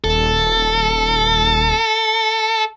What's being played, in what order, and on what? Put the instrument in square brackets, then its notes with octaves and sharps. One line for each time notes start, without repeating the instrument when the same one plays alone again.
[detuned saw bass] D#1 [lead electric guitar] A4